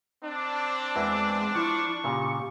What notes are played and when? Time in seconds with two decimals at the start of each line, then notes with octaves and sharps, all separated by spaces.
0.24 C4 D4
0.95 E2 E3 G#3 A#3
1.55 F3 E4 C#6
2.04 A#2 C#3 G4